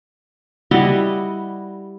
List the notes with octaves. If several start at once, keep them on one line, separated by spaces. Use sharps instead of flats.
G3 E4 F#4 D#5